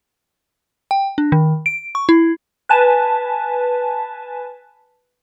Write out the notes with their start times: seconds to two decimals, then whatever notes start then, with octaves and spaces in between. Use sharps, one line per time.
0.91 G5
1.18 D4
1.32 D#3
1.66 D7
1.95 C#6
2.09 E4
2.69 B4 G#5 A5